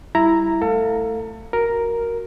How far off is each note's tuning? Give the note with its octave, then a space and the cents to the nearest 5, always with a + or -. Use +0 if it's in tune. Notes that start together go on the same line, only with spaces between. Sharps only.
G3 +0 E4 +0 A#5 +0
A3 +0 A4 +30 F5 +15
F#4 +0 A#4 +0